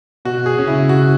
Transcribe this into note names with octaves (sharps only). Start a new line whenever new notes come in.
B2 F#4
G#4
C#4
C#3 E4
F#4